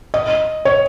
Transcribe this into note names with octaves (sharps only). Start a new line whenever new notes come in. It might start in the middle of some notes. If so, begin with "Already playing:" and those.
D#5
C#5